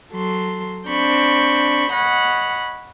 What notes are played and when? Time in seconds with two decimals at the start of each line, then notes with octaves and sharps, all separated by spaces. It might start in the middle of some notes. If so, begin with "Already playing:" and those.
0.11 F#3 A4 C6
0.88 C4 D4 B5 C#6 G6
1.92 C#5 D#5 F#5 B5